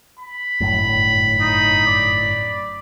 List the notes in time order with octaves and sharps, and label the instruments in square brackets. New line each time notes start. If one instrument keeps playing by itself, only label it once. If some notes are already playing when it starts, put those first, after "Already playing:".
[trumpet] B5
[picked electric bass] G1 F#2 A2
[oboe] D#4
D5